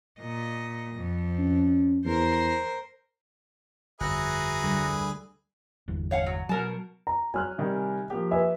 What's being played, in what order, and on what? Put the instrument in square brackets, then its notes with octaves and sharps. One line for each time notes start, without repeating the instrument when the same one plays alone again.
[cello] A#2 D#5
F2
[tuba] C#4
[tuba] E2 [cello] A#4 C5
[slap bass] G1 F2 [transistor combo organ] F#4 A#5 [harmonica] G#4 B4 E5
[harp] D2 G3
[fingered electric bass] G1 E2
[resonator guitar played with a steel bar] C#5 F5 F#5
F#3
[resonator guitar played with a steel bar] B2 A#4 A5 [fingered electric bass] F#3
[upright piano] A#5
[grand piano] F#3 [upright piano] G#5 F6 F#6
[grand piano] C3 D#3 G3
F3 A#3 G4
[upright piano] B4 E5 G#5